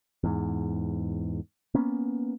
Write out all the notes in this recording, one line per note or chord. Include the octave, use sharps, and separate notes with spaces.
E2 G#2
A#3 B3 C#4